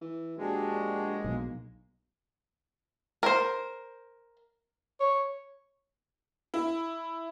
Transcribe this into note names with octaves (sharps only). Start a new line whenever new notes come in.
E3
A#1 G#3 D4 F#4 G4
B1 A#3
A#4 C5
C#5
E4